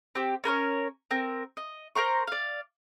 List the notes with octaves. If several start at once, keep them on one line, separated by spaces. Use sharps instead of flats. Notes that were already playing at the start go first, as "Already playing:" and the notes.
C4 G4
C#4 A#4 B4 C#5
C4 A#4
D#5
A#4 C5 A#5 C#6
D5 F5